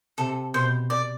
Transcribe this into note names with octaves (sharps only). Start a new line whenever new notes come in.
C3 A4
B2 C5
D5